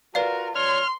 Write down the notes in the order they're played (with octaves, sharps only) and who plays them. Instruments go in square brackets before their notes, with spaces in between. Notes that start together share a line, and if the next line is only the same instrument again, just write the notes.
[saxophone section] F4 F#4 [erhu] A#4 [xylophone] B4 D5 F5
[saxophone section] F#3 D4 C#5 [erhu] C6 [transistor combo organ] F6